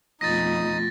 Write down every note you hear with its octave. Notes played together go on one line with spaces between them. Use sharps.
F2 B2 A3 D#4 F4 D#6 A6 A#6